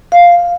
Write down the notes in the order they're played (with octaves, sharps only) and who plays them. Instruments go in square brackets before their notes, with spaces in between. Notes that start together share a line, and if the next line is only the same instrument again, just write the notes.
[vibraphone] F5